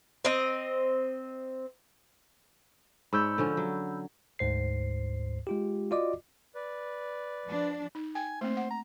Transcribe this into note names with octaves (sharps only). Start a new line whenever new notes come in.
C4 D#5
G#2 C#5 D5 B5 E6 G6
D3 F3 C#4
F#3
D2 G#2 C5 C7
G#3 F4 G4
F4 F#4 D5 D#5 D6
B4 D5
F3 D4
D#4
G5 G#5
A3 A#3 C4 C5
F#5
A#5